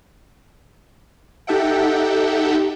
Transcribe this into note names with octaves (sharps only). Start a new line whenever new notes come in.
D#4 G4 A4 E5 F#5 G5